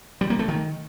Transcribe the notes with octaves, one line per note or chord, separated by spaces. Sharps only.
G3
A#3
A3
D#3